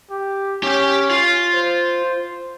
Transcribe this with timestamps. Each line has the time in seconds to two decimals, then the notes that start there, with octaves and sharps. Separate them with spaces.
0.10 G4
0.63 C#4 G4 G5
1.11 F4
1.54 C5